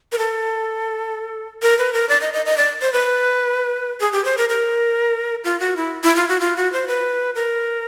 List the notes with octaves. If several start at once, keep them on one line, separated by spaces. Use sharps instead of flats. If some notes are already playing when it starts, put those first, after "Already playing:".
A#4
A4
A#4
B4
A#4
D5
D#5
D#5
D#5
D5
C5
B4
G#4
G4
C5
A#4
A#4
F4
F#4
E4
E4
F4
F#4
F4
F#4
C5
B4
A#4